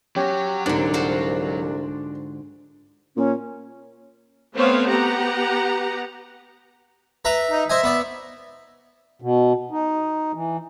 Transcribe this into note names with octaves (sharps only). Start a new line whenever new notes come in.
F#3 C#4 G4 C#5
C2 G#2 D3 D4
F4 F#4 C5
A#2 C#4
A3 B3 C4 C5 C#5 F5
B3 G4 F#5 A#5
B4 E5 A#5
D#4
C5 D#5 E5 G#5
B3 D5
B2
D#4
E3